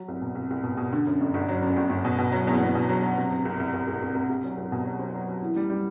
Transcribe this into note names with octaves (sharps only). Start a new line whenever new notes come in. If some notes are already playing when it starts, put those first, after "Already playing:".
Already playing: F#3
C2
B2
C2
C2
B2
B2
D3
F#2
G1
G1
F#3
F#2
G1
G1
B2
B2
F#3
E2
E2
B2
F#3
F#3
C3
C3
C2
C2
C2
C2
C2
C2
C2
F#3
C2
B2
F#3
C4
F#3
F#3
E3
G3
G3